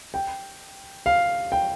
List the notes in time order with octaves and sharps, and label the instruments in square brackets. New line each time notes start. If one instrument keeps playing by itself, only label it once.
[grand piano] G5
F5
G5